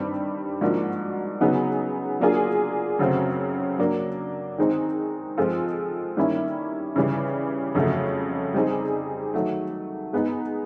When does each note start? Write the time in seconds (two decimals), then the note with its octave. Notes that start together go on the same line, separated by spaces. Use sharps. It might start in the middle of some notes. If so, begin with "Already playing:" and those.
Already playing: G2 D#3 G3 C4
0.61 G#2 F3 A#3 D4 F#4
1.41 C#3 F#3 B3 D#4 G#4
2.20 F#3 A#3 D4 F4 G#4
2.99 F#2 C#3 F#3 A3 C4
3.78 F#3 A#3 D4
4.58 D#3 G#3 C4 D#4
5.37 F3 G#3 C4 F4 A4
6.17 D#3 G3 A#3 C#4 E4
6.96 C#3 E3 G3
7.75 F2 C#3 F#3 A3
8.54 G3 C4 D#4 G#4
9.34 D#3 F#3 A3
10.13 G#3 B3 D#4